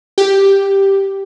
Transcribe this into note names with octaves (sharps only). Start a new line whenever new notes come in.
G4